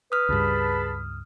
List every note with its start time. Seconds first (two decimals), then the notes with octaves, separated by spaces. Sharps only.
0.12 B4 D#6 F6
0.29 C#2 G2 G#4 A5 B5